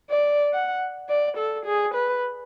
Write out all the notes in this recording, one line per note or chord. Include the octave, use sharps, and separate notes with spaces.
D5
F#5
D5
A4
G#4
B4